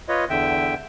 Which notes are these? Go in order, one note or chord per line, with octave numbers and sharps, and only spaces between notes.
F4 B4 C#5 D#5
E2 D3 E5 G5